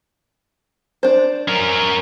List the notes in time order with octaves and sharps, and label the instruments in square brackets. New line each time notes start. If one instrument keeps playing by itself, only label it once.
[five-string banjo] D4 C5
[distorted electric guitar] C#4 A#4